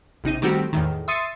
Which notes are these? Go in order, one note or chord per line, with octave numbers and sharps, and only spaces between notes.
A#1 C3 D#4 D#7
D#3 G3 A3 C4 F#4 G4
E2 A2 D#3
E5 C6 D#6 A6 C#7 D#7